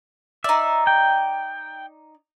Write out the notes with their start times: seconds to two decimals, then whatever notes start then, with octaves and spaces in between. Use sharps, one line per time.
0.44 D#4 D5 E5
0.87 G5